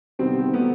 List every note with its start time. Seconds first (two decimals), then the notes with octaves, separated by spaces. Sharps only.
0.19 C3 D#3 G3 B3 C4
0.54 D#3 F#3 A3 B3